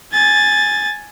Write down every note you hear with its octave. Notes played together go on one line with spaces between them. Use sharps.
G#5 A6